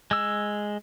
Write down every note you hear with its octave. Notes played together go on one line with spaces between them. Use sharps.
G#3 E6